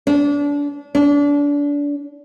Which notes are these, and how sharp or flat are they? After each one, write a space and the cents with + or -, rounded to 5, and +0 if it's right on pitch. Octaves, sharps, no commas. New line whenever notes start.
D4 -30
D4 -30